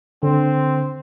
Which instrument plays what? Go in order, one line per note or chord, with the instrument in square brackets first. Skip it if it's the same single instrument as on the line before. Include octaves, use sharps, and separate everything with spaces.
[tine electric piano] D3 [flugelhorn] C4